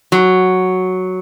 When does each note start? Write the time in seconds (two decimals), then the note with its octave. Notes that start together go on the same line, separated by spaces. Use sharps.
0.12 F#3